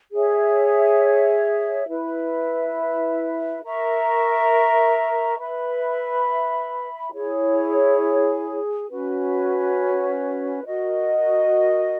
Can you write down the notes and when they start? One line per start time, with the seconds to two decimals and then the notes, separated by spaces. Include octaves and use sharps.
0.12 G#4 C#5 E5
1.88 E4 B4 E5
3.62 A#4 E5 A#5 C#6
5.38 B4 E5 B5
7.13 E4 G#4 C#5
8.89 C#4 F#4 B4
10.65 F#4 A#4 D#5